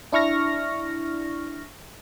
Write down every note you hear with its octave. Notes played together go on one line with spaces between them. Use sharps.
D4 E4 C#6 F6 A#6